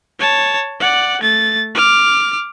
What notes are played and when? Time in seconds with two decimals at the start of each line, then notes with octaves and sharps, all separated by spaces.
0.19 C#5 A5
0.80 D5 F#5
1.21 A3 A6
1.75 D6 F6